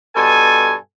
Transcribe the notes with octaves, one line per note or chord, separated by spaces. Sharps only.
G2 B2 A4 G#5